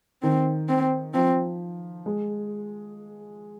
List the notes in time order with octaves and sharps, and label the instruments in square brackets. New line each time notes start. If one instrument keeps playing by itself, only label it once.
[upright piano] D#3 [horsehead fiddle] C4
[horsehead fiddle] C4
[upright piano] F3 [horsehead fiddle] C4
[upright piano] G#3